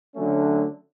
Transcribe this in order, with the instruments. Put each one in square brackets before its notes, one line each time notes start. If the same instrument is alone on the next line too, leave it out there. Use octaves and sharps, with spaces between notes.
[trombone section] D3 F#3 A3 C#4